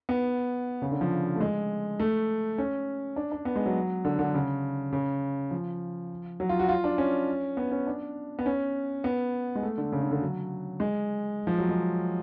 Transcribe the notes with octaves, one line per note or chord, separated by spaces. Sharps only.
B3
C#3
D3
F3
A3
G#3
A3
C#4
D4
D4
B3
G#3
F#3
D3
D3
C#3
C#3
F3
F#3
F4
F#4
F4
D4
C#4
B3
C#4
D4
B3
C#4
B3
G#3
A3
D3
C#3
D3
D3
F#3
G#3
F3
F#3
G#3